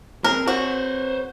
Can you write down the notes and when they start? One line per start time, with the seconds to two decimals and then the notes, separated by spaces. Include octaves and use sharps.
0.24 C4 G#4 A#4
0.48 F#4 C5 C#5